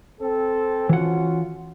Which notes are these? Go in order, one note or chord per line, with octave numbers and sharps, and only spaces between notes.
C4 A4
E3 C#4 F4 F#4 F#5